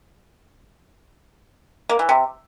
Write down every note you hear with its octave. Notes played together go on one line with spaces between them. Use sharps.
A#3
E3
C3